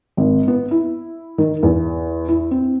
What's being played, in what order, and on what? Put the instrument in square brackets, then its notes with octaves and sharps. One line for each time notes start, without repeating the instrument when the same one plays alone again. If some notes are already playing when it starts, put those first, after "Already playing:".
[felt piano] G#1
B3
E4
D#3
E2
E4
C4